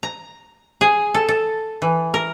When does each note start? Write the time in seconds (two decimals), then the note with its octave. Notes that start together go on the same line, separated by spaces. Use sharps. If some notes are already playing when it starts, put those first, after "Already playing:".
0.03 A#5
0.81 G#4
1.14 A4
1.29 A4
1.82 E3
2.14 A#4